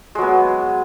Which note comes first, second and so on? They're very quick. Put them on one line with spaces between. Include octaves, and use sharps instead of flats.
G#3 F#3 B3